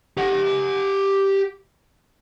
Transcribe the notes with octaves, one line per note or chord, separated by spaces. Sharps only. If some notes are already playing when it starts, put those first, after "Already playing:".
G4 F#5